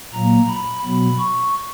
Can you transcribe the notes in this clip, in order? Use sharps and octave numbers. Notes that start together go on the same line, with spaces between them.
A#2 F#3 A#3 A#5
B5
B2 F#3 B3 B5
C#6